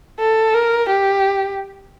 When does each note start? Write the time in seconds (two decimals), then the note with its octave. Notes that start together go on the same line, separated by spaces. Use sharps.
0.20 A4
0.54 A#4
0.89 G4